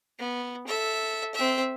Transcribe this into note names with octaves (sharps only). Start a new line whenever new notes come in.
B3
A4 E5
C4 E5